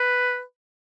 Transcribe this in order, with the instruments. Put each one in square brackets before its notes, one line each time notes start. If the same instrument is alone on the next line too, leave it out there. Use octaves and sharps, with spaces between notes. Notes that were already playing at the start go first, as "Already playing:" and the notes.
Already playing: [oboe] B4